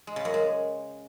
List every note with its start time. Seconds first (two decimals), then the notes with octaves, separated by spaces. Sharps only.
0.07 G#3
0.16 C#3
0.25 F#2
0.34 G#3